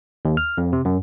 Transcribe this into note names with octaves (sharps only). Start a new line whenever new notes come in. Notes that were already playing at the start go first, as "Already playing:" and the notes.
D#2
F6
F2
C3
F#2